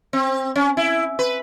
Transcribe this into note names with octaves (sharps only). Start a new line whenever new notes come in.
C4
C#4
E4
B4